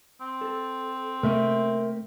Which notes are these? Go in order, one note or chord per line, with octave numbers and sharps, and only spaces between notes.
C4
A4
C3 A3 A#3 A#4 E5